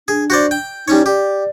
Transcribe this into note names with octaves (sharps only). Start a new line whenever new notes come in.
D4 G#4
F#4 C5 D5
G5
G3 C#4 D#4 C#5
G4 D5